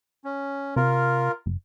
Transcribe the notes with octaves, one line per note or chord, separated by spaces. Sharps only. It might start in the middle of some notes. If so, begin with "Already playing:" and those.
C#4
C3 F4 A#4
F#1